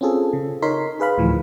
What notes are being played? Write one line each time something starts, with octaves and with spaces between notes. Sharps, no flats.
C4 C#4 F4 G#4 A4
C#3
D#4 A#4 C#5 C6 B6
G#4 B4 F5 B5
D2 A2 E3 F3